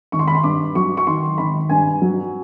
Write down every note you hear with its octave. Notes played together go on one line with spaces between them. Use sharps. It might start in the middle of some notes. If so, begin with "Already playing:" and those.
G#1 C#6
C6
B5
C6
G2 D6
F#3 C#6
C#6
D#3 C6
G#1 B5
G2 G#5
F#3